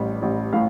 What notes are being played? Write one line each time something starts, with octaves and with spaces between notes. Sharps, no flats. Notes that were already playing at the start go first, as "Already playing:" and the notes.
Already playing: A1 G3
A1
A2 F5